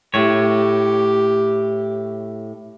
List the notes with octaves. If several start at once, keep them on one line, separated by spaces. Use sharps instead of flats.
A2 G4 C#5